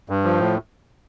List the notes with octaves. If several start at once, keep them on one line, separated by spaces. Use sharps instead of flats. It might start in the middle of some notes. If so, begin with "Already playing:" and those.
G2
F3
A2